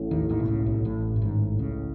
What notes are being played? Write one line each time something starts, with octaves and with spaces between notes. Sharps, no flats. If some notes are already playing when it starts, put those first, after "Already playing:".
Already playing: A1 A2
D#2 D#3
D#2 D#3
B2
C#2 C#3
B1 B2
A1 A2
A2
G#1 G#2
C#2 C#3